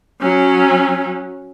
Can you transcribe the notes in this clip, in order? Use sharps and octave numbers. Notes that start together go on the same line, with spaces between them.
F#3 C#4